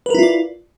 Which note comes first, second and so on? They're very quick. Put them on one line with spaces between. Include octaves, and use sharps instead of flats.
B4 A#4 E4 F4 D5